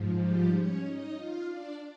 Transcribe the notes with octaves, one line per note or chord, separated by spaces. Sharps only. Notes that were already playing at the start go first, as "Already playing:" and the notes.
Already playing: G#2 F3
G3 G4
C#4 C#5
D#4 D#5
F4 F5
D4 D5